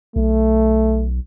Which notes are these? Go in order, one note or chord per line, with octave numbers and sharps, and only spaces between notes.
B1 A3